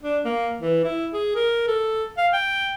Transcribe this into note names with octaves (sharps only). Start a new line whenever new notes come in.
D4
A#3
E3
E4
G#4
A#4
A4
F5
G5